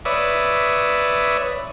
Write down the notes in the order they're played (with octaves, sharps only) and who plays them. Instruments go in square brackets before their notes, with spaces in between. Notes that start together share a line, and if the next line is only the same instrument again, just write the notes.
[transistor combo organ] B4 C#5 D5 E5 D#6